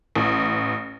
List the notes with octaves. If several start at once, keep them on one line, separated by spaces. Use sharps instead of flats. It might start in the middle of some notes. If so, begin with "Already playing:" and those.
A1